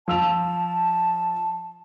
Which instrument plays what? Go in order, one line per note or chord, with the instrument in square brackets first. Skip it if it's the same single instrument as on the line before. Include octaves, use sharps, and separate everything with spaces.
[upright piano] F3 E6 F7 [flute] A5